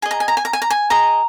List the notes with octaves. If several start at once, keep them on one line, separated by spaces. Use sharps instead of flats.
G#4 D#5 G#5
A#5
G#5
A#5
G#5
A#5
G#5
A#5
G#5
G#4 D#5 A#5